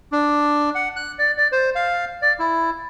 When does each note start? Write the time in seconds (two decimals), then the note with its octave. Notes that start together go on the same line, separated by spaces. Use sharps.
0.12 D4
0.75 F#5
0.96 F#6
1.19 D5
1.38 D5
1.52 C5
1.75 F5
2.22 D5
2.39 E4